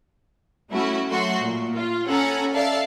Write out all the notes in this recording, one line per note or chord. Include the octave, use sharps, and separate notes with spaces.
A3 C#4 E4 F#4
F#3 A3 F#4 C6
A#2
F4
C#4 A4 F#5 G#5 A#5 B5
A4 D5 E5 F5 A5